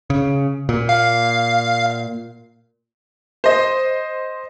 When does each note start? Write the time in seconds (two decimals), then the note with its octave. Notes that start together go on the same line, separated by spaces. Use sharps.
0.10 C#3
0.69 A#2
0.89 F5
3.44 C5 D#5